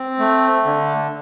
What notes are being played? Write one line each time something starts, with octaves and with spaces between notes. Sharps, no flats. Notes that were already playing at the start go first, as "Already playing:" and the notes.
Already playing: C4
A3
D3